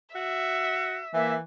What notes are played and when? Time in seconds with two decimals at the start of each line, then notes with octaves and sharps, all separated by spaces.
0.15 F#4 E5
1.14 E3 A#3 E5